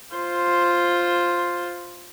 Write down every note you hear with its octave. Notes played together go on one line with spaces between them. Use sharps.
F4 C5